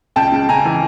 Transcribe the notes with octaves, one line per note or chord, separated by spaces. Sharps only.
C#2 G5 A5
C#3
C#2 G#5 A#5
E3